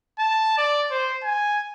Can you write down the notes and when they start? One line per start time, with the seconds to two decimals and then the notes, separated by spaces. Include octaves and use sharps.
0.19 A5
0.58 D5
0.91 C5
1.24 G#5